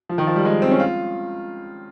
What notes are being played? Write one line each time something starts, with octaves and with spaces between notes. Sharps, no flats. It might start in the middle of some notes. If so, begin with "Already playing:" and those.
F3
D#3
F3
G3
G#3
C4
C#4
F4